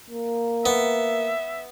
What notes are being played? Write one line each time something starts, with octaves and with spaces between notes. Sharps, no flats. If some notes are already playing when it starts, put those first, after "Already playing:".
A#3
B3 E5